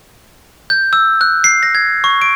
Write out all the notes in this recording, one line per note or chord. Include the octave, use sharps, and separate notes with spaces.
G6
E6
F#6
C7
A#6
G#6
C#6
D7